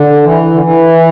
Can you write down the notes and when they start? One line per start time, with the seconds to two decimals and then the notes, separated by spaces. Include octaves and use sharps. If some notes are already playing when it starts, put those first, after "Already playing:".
Already playing: D3
0.23 E3
0.52 D3
0.62 E3